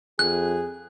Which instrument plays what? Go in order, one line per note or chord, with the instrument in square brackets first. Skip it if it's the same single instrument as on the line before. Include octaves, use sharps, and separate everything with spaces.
[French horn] F2 [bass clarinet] G#4 [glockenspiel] F#6